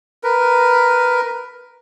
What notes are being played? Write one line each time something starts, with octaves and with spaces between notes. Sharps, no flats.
A#4 B4